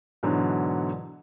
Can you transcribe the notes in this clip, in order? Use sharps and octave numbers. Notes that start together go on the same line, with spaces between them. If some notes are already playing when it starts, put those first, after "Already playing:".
G#2 B2 D3 E3 F#3